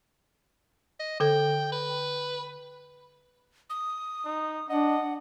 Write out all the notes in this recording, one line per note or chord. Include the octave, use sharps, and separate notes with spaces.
D#5
D3 A4 G5
B4
D#6
D#4
D4 D#5 F#5